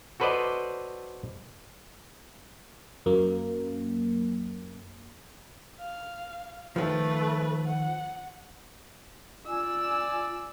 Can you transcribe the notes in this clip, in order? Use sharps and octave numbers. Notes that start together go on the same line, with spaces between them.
F#4 A4 B4 C5 D5 D#5
F#2 A#3
F5
D#3 F3 A3 B4
F#5
F4 D5 G#5 E6